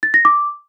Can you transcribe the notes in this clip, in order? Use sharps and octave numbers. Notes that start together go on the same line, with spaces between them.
A6
A#6
D6